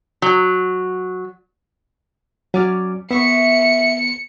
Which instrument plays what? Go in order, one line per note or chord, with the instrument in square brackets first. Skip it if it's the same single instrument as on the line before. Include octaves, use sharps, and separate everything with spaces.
[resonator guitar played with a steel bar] F#3
[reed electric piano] F#3 [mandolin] C#4 D5 F6
[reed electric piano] B3 [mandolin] E5 F#5 C#6 [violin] C#7